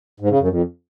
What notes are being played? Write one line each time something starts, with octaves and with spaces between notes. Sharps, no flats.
G#2
C#3
F#2
F2